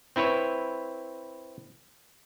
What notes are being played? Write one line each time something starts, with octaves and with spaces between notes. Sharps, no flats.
C4 E4 B4 C#5